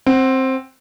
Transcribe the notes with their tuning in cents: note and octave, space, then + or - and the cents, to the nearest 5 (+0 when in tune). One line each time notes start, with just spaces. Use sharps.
C4 +10 F#5 +25